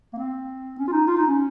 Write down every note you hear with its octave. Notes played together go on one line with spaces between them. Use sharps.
A#3
C4
C#4
F4
D#4
F4
D#4
C#4